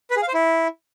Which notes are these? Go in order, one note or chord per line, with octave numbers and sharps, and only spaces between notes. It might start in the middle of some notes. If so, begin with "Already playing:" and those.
B4
G#4
F5
C5
E4